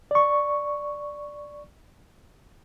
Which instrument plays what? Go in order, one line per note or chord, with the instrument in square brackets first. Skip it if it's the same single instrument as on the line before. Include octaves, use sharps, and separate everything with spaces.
[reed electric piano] D5 C#6